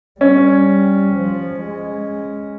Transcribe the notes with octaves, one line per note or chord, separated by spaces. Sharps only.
G3 C#4
F3
G#3